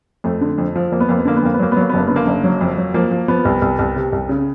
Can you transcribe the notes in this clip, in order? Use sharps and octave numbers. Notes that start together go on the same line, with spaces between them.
F2 A3
D3
F2
F3
F2 A#3
B3
F2 A#3
B3
D3 A#3
B3
F2 A#3
B3
F#3 A#3
B3
F#3 A#3
B3
F#1 A#3
D3 B3
A#3
F#1
F#3
F2
F#3
F3 A#3
F3
F3 B3
C2
C2
C2
C3
C2
C#3